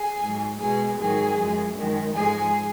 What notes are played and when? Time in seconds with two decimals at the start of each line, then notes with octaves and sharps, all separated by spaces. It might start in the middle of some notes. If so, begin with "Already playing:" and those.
Already playing: G#4 G#5
0.21 G#2 F#3
0.59 B2 G#3 G#4 G#5
0.97 G#2 D#3 F#3 G#4 G#5
1.36 F#2 F3 G#3
1.75 F#2 D#3 G#3
2.13 G#2 F3 G#3 G#4 G#5